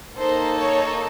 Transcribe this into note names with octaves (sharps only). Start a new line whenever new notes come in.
A#3 D#4 A4 C5
C#5